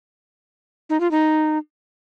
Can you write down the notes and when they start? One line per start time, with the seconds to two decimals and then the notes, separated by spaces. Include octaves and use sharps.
0.90 D#4
1.00 F4
1.11 D#4